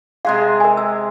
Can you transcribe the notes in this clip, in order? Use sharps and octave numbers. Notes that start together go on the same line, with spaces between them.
C3 G#3 G#4 F5
A#4 G#5
E6